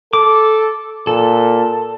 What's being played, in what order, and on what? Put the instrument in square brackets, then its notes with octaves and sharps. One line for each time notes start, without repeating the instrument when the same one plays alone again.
[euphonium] A4 [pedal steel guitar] D6
[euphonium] A#2 [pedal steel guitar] A4